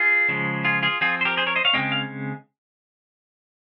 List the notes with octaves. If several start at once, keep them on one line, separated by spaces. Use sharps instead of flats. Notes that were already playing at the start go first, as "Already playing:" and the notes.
Already playing: F4 G#4
C#3 F3 G#3
F4 G#4
F4 G#4
F3 C4 F4 G#4
C5
G4 A#4
G#4 C5
A#4 C#5
C5 D#5
C#5 F5
C#3 F3 G#3 C4 D#5 G5
F5